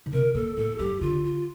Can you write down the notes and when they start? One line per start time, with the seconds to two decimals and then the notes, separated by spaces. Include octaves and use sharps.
0.06 D3
0.13 C3 A#4
0.34 A#2 A4
0.57 A2 A4
0.78 G2 G4
1.01 D3 F4
1.24 F4